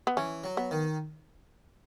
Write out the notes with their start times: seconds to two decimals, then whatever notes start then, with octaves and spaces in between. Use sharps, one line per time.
0.07 B3
0.17 E3 C#4
0.44 F#3
0.57 B3
0.71 D#3